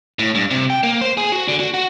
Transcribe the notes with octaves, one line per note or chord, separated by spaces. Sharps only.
A2
G2
C3
G5
A#3
C5
G#4
F#4
D3
F#4
F#4